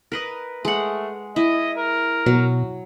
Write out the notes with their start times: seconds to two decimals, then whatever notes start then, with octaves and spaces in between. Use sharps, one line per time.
0.12 A#4 B4 D#5
0.65 G#3 A3 F#5
1.36 E4 D#5
1.77 A#4
2.26 B2 F#3